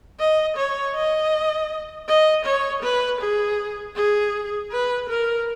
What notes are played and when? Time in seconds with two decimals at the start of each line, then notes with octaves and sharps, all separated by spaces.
0.19 D#5
0.56 C#5
0.95 D#5
2.08 D#5
2.45 C#5
2.82 B4
3.20 G#4
3.96 G#4
4.72 B4
5.09 A#4